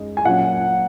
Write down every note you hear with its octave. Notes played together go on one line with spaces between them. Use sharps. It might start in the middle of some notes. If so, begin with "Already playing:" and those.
Already playing: F#2 G#3 D#4
G#5
A#2 F#3 C#4 F#5